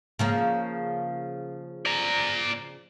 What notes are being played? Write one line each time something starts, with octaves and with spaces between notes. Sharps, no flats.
C#3 F3 A#3
D5 A#5